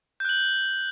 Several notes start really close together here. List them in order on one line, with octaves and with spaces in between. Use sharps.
G6 F#6 F#7